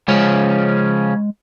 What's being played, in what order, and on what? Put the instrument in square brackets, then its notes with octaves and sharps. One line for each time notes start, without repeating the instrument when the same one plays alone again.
[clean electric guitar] C#3 F3 C#4 [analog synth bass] G#3